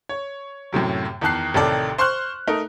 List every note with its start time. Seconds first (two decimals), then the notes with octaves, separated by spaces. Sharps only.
0.09 C#5
0.73 F#2 A2 C3 F#3
1.21 E2 D#3 A5 F#6 C7
1.54 A1 C3 D#3 A4 D5
1.98 C5 C6 C#6 F6 F#6
2.47 A3 D#4 A#4